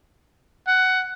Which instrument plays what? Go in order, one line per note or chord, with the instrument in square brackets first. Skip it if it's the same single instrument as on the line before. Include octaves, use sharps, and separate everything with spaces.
[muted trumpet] F#5